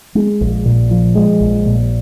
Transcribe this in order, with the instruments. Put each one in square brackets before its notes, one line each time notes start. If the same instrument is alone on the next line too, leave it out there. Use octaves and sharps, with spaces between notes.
[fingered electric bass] G#3
A#1
A#2
F3
G#3
A#1
A#2